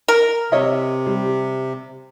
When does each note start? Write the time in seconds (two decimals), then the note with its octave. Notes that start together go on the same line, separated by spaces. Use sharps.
0.08 A#4
0.52 C3 C#5 D#5 E5
1.06 G3